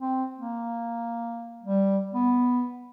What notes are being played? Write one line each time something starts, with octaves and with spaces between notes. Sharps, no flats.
C4
A#3
G3
B3